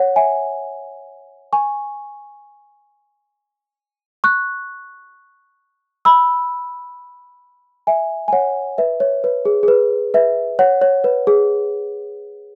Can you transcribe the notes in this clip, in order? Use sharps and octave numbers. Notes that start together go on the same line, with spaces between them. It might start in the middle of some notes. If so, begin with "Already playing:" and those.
Already playing: C#5 F#5
E5 G#5
G#5 C#6
C#6 F#6
B5 E6
E5 G#5
G#5
C#5 F#5
B4 E5
C#5
B4
G#4
G#4
B4
B4 E5
C#5 F#5
C#5
B4
G#4